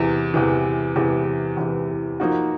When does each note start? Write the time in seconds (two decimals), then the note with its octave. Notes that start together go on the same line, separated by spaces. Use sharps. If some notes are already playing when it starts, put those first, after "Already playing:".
Already playing: E2 C3 E3
0.34 E2 C3 E3
0.96 E2 C3 E3
1.57 E2 C3 E3
2.20 F3 A#3 D#4 F#4